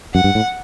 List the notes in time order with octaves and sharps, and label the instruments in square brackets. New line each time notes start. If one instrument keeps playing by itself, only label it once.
[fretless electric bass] F#2 [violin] F#5
[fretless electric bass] G2
A2